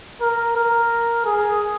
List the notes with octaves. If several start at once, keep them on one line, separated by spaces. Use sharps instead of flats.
A#4
A#4
G#4